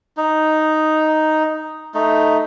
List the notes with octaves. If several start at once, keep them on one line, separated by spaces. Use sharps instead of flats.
D#4
A3 D#4